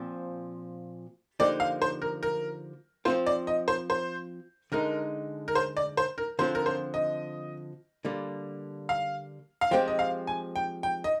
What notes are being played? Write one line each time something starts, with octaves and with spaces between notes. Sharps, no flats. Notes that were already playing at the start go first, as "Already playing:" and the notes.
Already playing: A#2 F3 C4
D3 F3 A#3 D#4 G4 D5
F5
C5
A#4
A#4
F3 C4 F4 C5
D5
D#5
C5
C5
D3 G#3 D#4 A#4
A#4
C5
D5
C5
A#4
D3 F3 C4 F4 C5
A#4
C5
D#5
D3 G3 A#3
F5
F5
F3 G#3 C4 G4 G5
D#5
F5
G#5
G5
G5
D#5